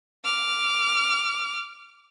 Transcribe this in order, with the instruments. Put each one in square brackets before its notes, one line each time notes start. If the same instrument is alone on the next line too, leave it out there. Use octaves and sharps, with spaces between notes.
[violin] D6 F6